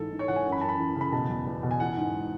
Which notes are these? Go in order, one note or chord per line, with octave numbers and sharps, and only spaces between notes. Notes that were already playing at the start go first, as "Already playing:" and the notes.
Already playing: G#2 E3 A4
G#2
C#5
E3 F#5
G#5
F#2
B5
F#2 A5
B5
E3
C#3
B5
B2 A5
E2
E2
B2
G#5
E3 F#5
G#2